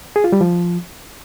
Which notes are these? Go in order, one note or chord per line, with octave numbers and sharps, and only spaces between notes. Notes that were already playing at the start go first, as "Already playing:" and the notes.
G#4
F4
G3
F3